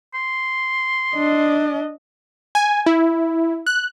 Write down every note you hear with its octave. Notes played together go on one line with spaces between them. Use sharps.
C6
D4 D#5
G#5
E4
F#6